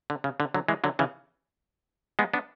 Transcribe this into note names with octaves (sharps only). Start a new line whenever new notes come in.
D3
C#3
D3
D3 F#3
E3 G#3
D3 F#3
C#3 E3
G#3 B3
B3 D4